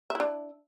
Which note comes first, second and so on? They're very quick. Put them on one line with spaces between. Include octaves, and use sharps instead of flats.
E5 E4 D4